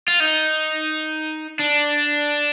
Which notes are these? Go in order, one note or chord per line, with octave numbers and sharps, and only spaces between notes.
F4
D#4
D4